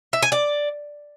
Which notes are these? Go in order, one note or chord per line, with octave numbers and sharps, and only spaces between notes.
E5
G#5
D5